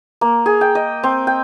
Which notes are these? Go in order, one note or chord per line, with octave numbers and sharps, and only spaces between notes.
A#3
G#4
G5
D#5
C4
G5